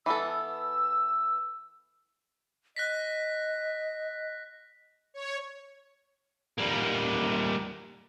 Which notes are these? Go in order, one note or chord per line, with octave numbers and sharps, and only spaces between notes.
E3 B3 A4 E6
D#5 F#6 A#6 B6
C#5
G3 A#3